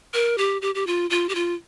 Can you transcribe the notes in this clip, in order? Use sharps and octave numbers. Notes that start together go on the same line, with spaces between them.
A#4
G4
G4
G4
F4
F4
G4
F4